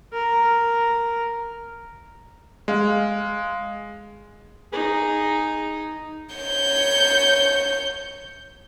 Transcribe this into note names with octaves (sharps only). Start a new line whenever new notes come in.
A#4
G#3 F5
D#4 G#4
C#5 G6